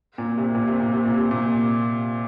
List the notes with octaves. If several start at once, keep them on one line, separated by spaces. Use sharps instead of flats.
A#2
C3
A#2
C3
A#2
C3
A#2
C3
A#2